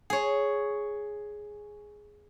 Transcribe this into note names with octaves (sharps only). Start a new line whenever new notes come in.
G#4 C#5